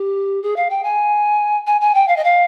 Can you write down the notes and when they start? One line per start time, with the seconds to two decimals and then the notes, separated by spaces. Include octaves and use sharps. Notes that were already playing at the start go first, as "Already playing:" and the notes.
Already playing: G4
0.42 G#4
0.56 F5
0.70 G5
0.83 G#5
1.66 G#5
1.81 G#5
1.94 G5
2.08 F5
2.16 D#5
2.24 F5